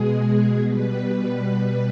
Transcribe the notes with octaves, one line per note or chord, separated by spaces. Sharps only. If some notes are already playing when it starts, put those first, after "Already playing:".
Already playing: B2 G#3 G#4
B2 G3 B4